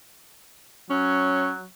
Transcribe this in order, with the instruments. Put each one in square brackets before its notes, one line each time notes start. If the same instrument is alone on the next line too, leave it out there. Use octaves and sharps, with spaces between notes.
[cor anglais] F#3 [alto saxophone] C#4